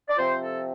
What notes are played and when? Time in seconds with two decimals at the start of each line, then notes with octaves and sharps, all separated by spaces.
0.09 D5
0.17 C3 F3 C4 F4 C5
0.41 A4